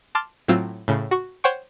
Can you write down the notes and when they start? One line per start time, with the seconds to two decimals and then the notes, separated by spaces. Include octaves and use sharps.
0.15 A5 C6 D6 F6 A6
0.48 A2 F#3 C4 F4 E6
0.88 A2 C#3
1.11 F#4 C#6
1.44 C5 C#5 F#5 G5 C#6